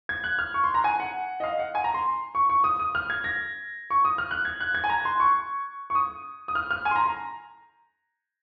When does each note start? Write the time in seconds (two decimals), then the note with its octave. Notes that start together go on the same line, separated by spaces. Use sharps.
0.09 G#6
0.24 F#6
0.39 F6
0.54 C#6
0.64 C6
0.74 A#5
0.84 G#5
1.00 F#5
1.40 D#5
1.44 F5
1.59 F#5
1.75 G#5
1.84 A#5
1.94 C6
2.35 C#6
2.49 C#6
2.64 D#6
2.79 D#6
2.95 F6
3.10 G#6
3.24 A#6
3.90 C#6
4.05 D#6
4.18 F6
4.31 F#6
4.45 G#6
4.60 F#6
4.75 G#6
4.84 G#5
4.89 A#5
5.05 C6
5.20 C#6
5.90 C#6
5.95 D#6
6.48 D#6
6.55 F6
6.71 F6
6.85 G#5
6.91 C6
6.96 A#5
7.06 A#5